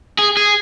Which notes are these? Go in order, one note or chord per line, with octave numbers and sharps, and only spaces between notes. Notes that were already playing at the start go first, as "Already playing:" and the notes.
G#4
G#4